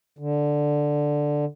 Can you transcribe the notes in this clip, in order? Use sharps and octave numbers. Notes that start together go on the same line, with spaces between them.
D3